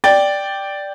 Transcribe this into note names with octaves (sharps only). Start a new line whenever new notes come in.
D5 G5 A6